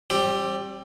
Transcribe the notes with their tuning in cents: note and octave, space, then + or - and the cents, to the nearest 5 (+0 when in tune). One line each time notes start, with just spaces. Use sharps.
G3 +0 C4 +40 G4 +0